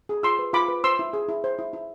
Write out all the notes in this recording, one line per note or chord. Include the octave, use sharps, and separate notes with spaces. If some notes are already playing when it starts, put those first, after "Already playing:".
G#4
F4 C6 E6
B4
F4 B5 D6
B4
C5 C6 E6
E4
G#4
E4
C5
E4
E4